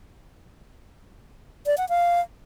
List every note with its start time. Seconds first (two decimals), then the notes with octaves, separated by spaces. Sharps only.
1.66 D5
1.78 F#5
1.89 F5